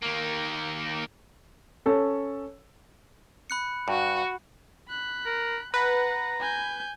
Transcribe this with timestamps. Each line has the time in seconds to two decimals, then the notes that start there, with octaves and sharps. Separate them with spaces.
0.03 D#3 A#3
1.86 C#4 A4
3.50 B5 F#6 C#7
3.88 G2 F#4
4.89 B5 F#6
5.26 A#4
5.74 B4 F#5 A#5
6.40 G#5 G6